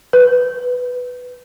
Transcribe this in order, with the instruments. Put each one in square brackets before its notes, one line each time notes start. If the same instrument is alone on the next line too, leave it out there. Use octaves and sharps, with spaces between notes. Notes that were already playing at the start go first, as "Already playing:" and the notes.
[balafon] B4